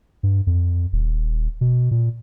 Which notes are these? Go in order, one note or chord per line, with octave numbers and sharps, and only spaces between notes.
G2
F2
D#1
B2
A#2